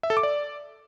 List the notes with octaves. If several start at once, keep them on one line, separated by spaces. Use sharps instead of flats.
E5
A4
D6
D5